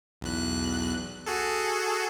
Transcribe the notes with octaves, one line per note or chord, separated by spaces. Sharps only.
B1 E2 F#6
F#4 G#4 A4